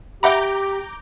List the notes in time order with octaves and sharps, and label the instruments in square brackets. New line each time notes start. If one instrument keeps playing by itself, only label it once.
[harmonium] G4 [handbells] E5 F#5 B5 [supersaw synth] A#5 D6 G6